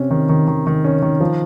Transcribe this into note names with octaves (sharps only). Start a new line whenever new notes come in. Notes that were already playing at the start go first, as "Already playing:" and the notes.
Already playing: C3 C#4
D#3
D#3
D#3
D#3
C#4
D#3
F3